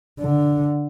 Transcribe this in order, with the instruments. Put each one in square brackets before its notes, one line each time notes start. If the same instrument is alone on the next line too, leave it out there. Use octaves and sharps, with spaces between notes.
[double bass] D3